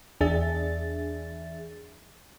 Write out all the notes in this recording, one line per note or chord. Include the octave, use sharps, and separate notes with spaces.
E2 D4 G#4 E5 A6